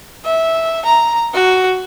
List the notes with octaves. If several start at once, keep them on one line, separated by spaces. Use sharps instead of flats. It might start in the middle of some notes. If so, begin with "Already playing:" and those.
E5
A#5
F#4